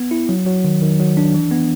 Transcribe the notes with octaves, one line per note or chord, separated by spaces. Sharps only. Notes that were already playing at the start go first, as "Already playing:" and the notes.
Already playing: B3
E4
F#3
F#3
D#3
D#3
F#3
D4
E3
B3